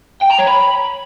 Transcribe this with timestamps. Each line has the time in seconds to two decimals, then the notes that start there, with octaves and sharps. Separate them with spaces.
0.22 G5
0.31 A#5
0.39 C#5
0.47 B5